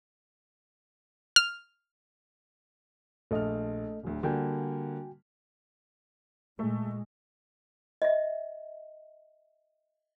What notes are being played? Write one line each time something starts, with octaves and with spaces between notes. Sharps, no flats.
F6
A#1 A3 A4 D#5 F6
D1 D2
D3 G3 A#3 F#4 G5 G#5
A#2 G#3 A3
D#5 E5